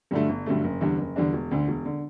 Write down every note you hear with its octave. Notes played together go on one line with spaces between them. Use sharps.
G2 D3 F#3 A3
G1
G2 D3 F#3 A3
F#1
E2 D3 G3 D4
F#1
E2 D3 G3 D4
E1
D2 D3
E1
D3